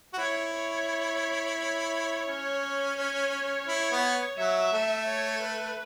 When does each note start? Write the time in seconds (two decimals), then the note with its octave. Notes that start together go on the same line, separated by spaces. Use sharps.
0.13 F#4
0.18 E4 C#5
0.54 C#5
1.58 C#5
2.28 C#4
2.98 C#5
3.68 E4
3.91 B3
4.37 F#3 E5
4.73 A3
5.07 C#5
5.42 B4